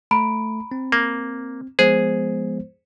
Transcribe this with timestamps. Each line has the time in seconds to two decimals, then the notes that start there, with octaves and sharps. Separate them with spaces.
0.11 A3 A#5 B5 D7
0.72 C4
0.92 A#3
1.79 F3 G#3 B3 G#4 C5